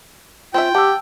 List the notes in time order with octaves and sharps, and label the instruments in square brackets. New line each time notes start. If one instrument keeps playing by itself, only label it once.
[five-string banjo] C4 C#4 E5 [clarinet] F4 [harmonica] G5
[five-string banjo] D4 F#5 [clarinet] G4 [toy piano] A5 D6 E6